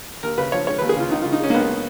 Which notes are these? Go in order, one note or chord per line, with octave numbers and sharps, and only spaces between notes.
D#2 A#4
C#3 B4
F3 C#5
G#3 C#5
B4
D#2
G#4
C#3 F4
C#2 D#4
F4
C#3
D#4
G#3 C#4
A#3
C#2 B3